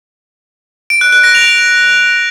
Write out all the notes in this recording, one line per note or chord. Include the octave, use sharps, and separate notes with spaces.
D7
F#6
F#6
A#6
F7